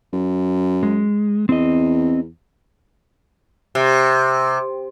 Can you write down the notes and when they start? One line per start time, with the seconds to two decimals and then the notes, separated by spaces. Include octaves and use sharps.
0.13 F#2
0.83 G#3
1.49 E2 C4 D#5
3.75 C3